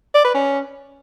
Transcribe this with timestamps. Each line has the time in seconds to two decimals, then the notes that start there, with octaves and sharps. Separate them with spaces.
0.15 D5
0.25 B4
0.34 C#4